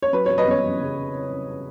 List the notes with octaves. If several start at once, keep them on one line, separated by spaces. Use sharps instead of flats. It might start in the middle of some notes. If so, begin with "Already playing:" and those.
C#5
F#3 B4
F#3 C#5
B4 D#5
B3 C#5
F#2
C#3